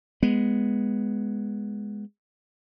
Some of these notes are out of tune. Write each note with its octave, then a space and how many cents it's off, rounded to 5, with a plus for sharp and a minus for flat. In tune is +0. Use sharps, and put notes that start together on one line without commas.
G#3 +0 B3 +0